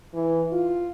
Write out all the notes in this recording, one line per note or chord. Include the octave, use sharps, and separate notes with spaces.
E3
F4